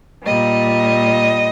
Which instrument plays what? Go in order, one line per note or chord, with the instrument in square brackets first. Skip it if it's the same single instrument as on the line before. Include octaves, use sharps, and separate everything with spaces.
[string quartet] A#2 G3 D#5